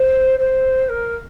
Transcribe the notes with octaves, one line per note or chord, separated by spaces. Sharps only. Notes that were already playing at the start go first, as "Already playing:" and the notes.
Already playing: C5
C5
A#4